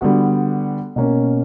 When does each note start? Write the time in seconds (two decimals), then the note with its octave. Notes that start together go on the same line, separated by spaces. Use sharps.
0.01 D3 G3 B3 F#4
0.96 B2 A#3 C#4